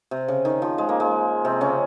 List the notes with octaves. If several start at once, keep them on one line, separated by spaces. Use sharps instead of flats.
C3
C#3
D#3
F3
G#3
A#3
G#3
C3 C4
C#3 C#4